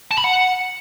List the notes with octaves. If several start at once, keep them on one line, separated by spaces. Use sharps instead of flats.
A5
B5
F#5